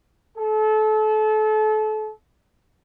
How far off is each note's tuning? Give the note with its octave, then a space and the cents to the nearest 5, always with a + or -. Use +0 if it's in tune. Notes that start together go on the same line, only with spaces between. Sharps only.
A4 -30